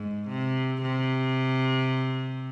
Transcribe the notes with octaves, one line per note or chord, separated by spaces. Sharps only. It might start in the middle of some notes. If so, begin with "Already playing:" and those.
Already playing: G#2
C3
C3